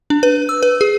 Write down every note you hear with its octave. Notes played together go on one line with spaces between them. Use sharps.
D4
B4
E6
B4
G#4